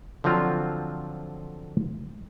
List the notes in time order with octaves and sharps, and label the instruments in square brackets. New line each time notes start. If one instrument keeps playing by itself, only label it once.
[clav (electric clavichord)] D3 F3 F#3 C4 F4